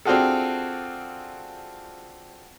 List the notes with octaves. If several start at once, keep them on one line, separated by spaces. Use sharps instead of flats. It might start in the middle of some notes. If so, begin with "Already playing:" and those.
C4 D4 F4 F#4 G#4 A4